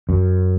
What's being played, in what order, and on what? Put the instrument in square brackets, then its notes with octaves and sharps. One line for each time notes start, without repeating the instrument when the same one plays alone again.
[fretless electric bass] F#2